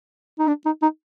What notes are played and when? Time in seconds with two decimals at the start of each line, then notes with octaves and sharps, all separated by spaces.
0.39 D#4
0.48 D4
0.66 D#4
0.82 D#4